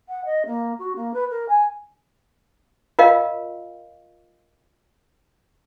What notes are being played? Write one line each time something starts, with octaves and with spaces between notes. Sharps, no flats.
F#5
D#5
A#3
F#4
A#3
B4
A#4
G#5
F4 A#4 D#5 F5